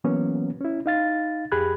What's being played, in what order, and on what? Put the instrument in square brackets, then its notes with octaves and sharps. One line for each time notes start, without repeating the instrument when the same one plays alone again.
[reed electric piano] E3 F#3 A#3 B3 C#4
C#4 E4
D#4 F5 A6
F2 G4 G#4 B5 F#6 G#6